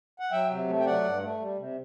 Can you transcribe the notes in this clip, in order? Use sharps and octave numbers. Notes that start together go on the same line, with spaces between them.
F#5
F#3 E5 G5
C3
A3
G5
F#3 D5 F#5
G2
A3
G3
C3